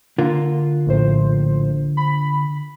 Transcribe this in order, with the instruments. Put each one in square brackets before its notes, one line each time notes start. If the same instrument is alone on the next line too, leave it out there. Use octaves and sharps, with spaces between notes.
[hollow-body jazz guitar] D3 A#3 F4
[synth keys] A#1 A2 C5
B5